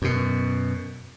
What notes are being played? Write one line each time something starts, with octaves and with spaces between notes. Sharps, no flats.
F#2 B2